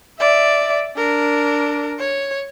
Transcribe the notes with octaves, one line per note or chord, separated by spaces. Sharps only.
D5 E5
D4 A#4
C#5